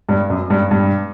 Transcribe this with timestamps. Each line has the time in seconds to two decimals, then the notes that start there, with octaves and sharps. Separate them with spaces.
0.09 G2
0.30 F#2
0.50 G2
0.71 G2